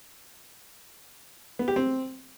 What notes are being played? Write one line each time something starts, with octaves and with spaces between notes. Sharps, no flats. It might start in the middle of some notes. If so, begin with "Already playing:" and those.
B3
G4
C4